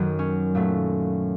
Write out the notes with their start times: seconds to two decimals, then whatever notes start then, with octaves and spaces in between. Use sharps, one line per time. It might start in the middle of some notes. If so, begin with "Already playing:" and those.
Already playing: F#2 D#3 F#3
0.19 C#4
0.55 A#2 F#3 A3